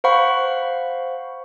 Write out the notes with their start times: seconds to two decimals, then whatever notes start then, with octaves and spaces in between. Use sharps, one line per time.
0.04 C5 F5 F#5 B5 C#6